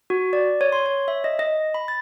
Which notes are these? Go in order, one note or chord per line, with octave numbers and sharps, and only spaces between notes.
F#4
D5
C#5
C6
C#5
E5
D#5
D#5
B5
A6